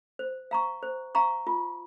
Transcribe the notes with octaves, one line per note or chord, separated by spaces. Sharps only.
C5
F5 A#5 C#6
C5
F5 A#5 C#6
F4